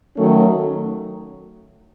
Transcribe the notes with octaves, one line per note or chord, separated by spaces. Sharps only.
D#3 F#3 A3 C#4